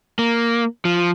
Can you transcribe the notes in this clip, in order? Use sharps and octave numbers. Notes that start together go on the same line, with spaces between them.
A#3
F3